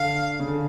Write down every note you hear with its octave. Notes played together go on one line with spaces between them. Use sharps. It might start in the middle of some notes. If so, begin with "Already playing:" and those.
Already playing: D3 F5
C#3
D3